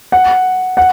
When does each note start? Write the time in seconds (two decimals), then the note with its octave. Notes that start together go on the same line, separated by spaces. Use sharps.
0.12 F#5
0.77 F#5